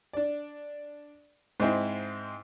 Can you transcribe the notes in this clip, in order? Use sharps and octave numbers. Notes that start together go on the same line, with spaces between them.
D4 D5
G#2 G#3 C4 E4